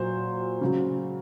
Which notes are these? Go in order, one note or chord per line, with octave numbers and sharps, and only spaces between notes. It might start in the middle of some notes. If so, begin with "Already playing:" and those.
Already playing: A#2 F#3 C5
C#3 F#3